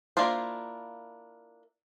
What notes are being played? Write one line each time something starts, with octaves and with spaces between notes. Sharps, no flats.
A#3 D4 E4 F4 C5